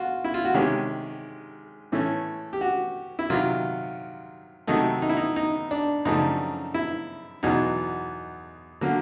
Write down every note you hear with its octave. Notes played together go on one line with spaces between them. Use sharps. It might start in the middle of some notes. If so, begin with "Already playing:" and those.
Already playing: F4 F#4
E4
F4
F#4
C3 D#3 G#3 C#4 G4
A2 E3 A3 C#4
G4
F#4
E4
C3 D#3 F#3 F4
C3 D#3 F#3 A3 D#4
D#4
E4
D#4
D#4
D4
F#2 C#3 F3 A3 D4 D#4
E4
E2 B2 F#3 D#4
D3 F#3 A#3